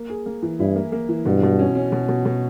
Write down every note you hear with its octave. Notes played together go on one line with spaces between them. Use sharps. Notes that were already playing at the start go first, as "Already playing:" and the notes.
Already playing: A#3
G#4
A#3
E3
G2 E4
A#3
A#3
E3
G2 B2
B2
C#4
C#4
B2
B2
B2